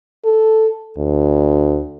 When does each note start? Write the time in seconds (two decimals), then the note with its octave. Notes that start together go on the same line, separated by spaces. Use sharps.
0.25 A4
0.97 D2